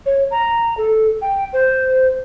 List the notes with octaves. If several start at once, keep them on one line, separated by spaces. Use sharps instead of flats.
C#5
A#5
A4
G5
C5